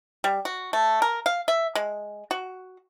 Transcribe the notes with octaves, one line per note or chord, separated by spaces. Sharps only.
G3
F#4
A3
A#4
F5
E5
G#3
F#4